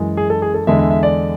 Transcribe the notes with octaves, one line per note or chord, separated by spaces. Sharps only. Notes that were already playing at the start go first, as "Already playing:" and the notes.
Already playing: F#2 E3 G#3
G#4
A4
G#4
A4
E2 D3 G#3 E5
E5
E5
D5